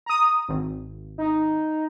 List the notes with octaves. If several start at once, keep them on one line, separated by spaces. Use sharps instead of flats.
A#5 D#6
G#1
D#4